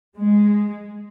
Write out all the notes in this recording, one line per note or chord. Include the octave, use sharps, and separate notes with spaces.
G#3